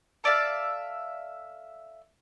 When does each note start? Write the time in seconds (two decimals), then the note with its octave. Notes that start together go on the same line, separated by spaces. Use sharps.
0.24 A4 D5 E5 F5